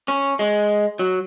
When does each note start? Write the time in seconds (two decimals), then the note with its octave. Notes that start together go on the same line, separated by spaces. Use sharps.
0.08 C#4
0.39 G#3
0.99 F#3